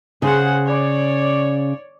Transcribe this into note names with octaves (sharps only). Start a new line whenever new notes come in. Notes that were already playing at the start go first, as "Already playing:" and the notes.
C#3 G#4 C5 F#5
C#5 D5